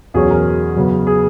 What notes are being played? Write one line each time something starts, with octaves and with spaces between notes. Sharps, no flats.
E2 B2 F#3 C#4 G#4
A#4
F#2 C#3 F#3 B3
G#4